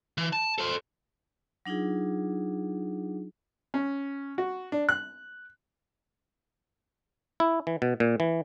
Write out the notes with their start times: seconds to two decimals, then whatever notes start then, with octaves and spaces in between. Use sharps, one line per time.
0.18 E3
0.33 A5
0.58 A4 C5
1.66 F#3 D4 D#4 F4 G#4
3.74 C#4
4.38 F#4
4.72 D4
4.89 F#6
7.40 E4
7.67 E3
7.82 B2
8.00 A#2
8.20 E3